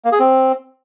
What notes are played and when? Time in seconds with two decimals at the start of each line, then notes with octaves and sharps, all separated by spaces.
0.05 A#3
0.12 G#4
0.19 C4